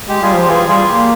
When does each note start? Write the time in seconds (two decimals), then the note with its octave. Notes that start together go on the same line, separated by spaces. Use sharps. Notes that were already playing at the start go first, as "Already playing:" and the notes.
0.08 G#3 G4
0.22 G3 F4 G#4
0.35 F3 G4
0.48 E3 F4 G#4
0.68 G3 F4 G#4
0.88 A#3 G4